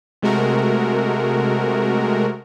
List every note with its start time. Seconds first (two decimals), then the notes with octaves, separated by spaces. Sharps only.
0.22 C3 G#3 A3 F#4 A#4